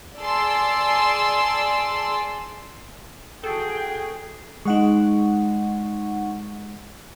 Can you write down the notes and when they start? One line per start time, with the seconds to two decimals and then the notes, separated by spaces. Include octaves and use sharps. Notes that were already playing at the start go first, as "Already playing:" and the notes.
0.20 G#4 D5 A5 C6 E6
3.44 F#4 G#4 A4 G5
4.65 G#3 D#4 F#5 C#6